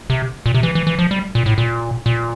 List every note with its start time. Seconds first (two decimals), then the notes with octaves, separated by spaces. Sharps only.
0.10 C3
0.46 A#2
0.55 C3
0.63 E3
0.75 E3
0.87 E3
0.99 F3
1.11 G3
1.35 A#2
1.46 A2
1.58 A#2
2.06 A#2